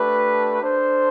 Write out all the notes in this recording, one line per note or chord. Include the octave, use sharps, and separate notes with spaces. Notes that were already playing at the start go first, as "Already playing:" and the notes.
Already playing: A3 D4 G4 B4
D4 A4 C5